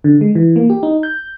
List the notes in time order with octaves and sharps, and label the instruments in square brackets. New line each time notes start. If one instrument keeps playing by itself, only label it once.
[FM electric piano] D3
G#3
E3
A#3
G4
D#4
G6